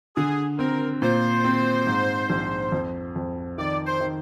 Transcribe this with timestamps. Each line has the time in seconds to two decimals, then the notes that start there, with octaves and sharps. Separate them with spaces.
0.16 D3 G#4
0.59 C4 A#4
1.02 A#2 C5
1.44 C4
1.87 G#2
2.30 A#1
2.72 F2
3.16 F2
3.58 D#3 D5
3.86 C5
4.00 D#3